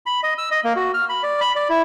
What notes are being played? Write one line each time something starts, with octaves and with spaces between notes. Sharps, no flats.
B5
D#5
E6
D#5
A#3
F#4
F6
B5
D5
B5
D5
E4